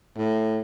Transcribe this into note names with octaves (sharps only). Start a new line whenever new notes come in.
A2